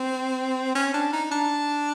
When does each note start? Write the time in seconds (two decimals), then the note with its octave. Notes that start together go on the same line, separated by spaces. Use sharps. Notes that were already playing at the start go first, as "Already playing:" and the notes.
Already playing: C4
0.75 C#4
0.94 D4
1.13 D#4
1.31 D4